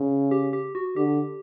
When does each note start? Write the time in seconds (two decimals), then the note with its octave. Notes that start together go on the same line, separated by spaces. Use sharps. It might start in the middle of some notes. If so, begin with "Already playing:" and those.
Already playing: C#3
0.31 G4
0.53 G4
0.75 F#4
0.96 D3 G4